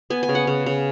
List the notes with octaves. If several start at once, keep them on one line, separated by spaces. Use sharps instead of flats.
B3 G#5
G#5
C#3
F#5
C#3
C#3